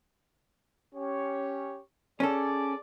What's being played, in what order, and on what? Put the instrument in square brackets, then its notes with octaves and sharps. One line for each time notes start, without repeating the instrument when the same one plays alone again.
[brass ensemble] C#4 G4 C#5
[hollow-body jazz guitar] C#4 A4 [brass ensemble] G#4 D5